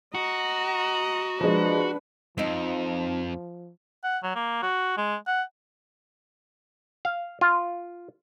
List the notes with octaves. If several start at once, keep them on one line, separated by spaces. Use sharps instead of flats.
F#4 D#5 A#5
F3 G#3 D4 B4
F2 F3 C4 D#4
F#5
F#3
A#3
F#4
G#3
F#5
F5
F4